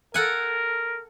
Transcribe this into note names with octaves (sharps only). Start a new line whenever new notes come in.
A4 A#4 F#5 G#5